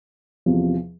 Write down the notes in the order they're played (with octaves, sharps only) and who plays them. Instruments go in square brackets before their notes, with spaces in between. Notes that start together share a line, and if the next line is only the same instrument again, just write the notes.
[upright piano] E2 C3 F3